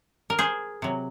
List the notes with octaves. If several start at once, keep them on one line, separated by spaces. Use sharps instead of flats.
A#4
G#4 C5
C3 F#3